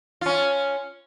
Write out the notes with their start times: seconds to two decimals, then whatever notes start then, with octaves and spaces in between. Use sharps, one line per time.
0.21 C#4 F4